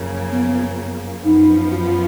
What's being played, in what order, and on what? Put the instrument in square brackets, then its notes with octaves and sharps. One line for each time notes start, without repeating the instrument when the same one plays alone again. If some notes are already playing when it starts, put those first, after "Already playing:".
Already playing: [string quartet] F#2 C#3 F3 A#3
[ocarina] B3
[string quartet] F#2 F3 B3 [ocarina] D#4
[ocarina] F#4
F4